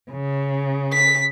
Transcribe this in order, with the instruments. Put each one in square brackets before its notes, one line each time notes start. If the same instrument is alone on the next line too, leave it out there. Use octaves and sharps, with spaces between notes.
[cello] C#3
[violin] B6